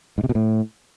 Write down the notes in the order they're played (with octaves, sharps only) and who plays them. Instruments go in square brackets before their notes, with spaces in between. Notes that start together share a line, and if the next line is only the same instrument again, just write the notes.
[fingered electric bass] G#2
C3
B2
A2